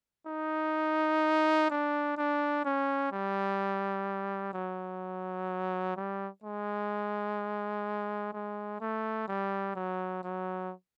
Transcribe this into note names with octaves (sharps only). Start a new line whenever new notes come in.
D#4
D4
D4
C#4
G3
F#3
G3
G#3
G#3
A3
G3
F#3
F#3